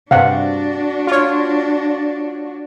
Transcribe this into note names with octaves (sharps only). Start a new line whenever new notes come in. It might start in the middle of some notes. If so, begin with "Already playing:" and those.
G2 C3 D4 F#4 F5 F#5
F4 C#5